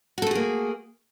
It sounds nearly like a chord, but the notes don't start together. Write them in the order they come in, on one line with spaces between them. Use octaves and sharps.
F#4 A4 A3 G#4 A#3